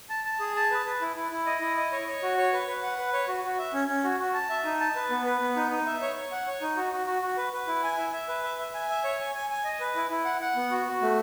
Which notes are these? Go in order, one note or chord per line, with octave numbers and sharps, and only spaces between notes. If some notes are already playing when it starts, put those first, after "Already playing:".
A5
A5
G#4
A5
B4
B4
E4
E4
E4
D#5
E4
D#5
C#5
C#5
F#4
C#5
B4
B4
F#5
B4
C#5
F#4
F#4
E5
C#4
C#4
F#4
F#4
A5
E5
D#4
A5
B4
B3
B4
B3
D#4
D#4
E5
C#5
C#5
F#5
C#5
D#4
F#4
F#4
F#4
F#4
B4
B4
E4
G#5
E5
E5
B4
E5
E5
G#5
E5
C#5
G#5
G#5
G#5
D#5
B4
E4
E4
F#5
F#5
B3
F#4
F#4
A3